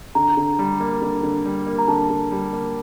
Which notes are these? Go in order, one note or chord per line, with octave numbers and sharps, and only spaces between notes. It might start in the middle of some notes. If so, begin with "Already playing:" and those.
D3 A#5
D3
G3
A#3
D3
D3
G3
A#3
A#5
D3 A5
D3
G3
A#3